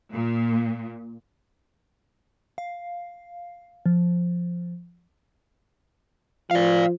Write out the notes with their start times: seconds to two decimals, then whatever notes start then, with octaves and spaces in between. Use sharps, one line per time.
0.11 A#2
2.58 F5
3.86 F3
6.51 F3 D5 F5